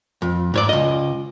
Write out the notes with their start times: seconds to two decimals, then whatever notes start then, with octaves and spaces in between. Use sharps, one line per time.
0.22 F2
0.54 G#2 C#5 D5
0.69 C#2 D#5